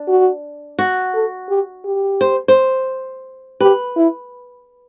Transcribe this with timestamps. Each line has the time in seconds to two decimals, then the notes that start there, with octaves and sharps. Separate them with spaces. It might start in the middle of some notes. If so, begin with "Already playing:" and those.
Already playing: D4
0.08 F#4
0.79 F#4
1.14 A4
1.49 G4
1.85 G4
2.21 C5
2.48 C5
3.60 G4 B4
3.96 E4